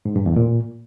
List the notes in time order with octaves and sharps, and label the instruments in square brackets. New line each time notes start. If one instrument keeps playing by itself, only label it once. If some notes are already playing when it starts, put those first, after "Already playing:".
[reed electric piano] G#2
G2
E2
A#2